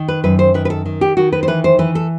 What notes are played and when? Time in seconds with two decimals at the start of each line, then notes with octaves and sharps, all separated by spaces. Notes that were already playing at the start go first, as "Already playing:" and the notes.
Already playing: D#3
0.08 B4
0.24 F#2 B4
0.39 C5
0.54 D#3 B4
0.65 B4
0.70 A4
0.86 D#3
1.01 G4
1.17 D#3 F#4
1.33 B4
1.43 C5
1.48 E3 B4
1.64 C5
1.79 E3 B4
1.95 A4